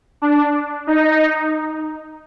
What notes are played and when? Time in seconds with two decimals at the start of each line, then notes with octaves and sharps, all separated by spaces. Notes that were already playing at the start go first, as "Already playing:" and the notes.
0.22 D4
0.87 D#4